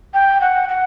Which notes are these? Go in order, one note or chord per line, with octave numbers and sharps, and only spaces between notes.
G5
F#5
F#5